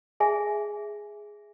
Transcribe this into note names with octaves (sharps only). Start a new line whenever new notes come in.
G#4 E5 G#5